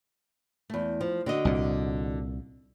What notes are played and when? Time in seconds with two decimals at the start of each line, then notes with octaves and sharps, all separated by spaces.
0.70 E2 A3
1.01 F3
1.26 D3 F#4 D#5
1.45 C2 A#2